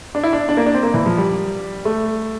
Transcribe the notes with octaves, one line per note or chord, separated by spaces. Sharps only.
D4
E4
D4
D4
A#3
D4
C4
A#3
E3
F3
G3
A3